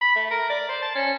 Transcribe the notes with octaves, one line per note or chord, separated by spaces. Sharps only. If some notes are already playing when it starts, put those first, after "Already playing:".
B5
A3
A#4
D5
C5
A5
C#4